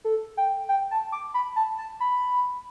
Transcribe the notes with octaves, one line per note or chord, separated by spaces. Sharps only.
A4
G5
G5
A5
D6
B5
A5
A5
B5